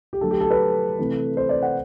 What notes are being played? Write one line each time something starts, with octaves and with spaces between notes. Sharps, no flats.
G4
D3 F#3 A3 A4
G4
A4
B4
C3 E3 A3
C5
D5
F#5